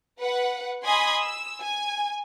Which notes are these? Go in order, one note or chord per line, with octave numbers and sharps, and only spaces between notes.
B4 F#5
D#5 G#5 B5 C6 D#6
E6
G#5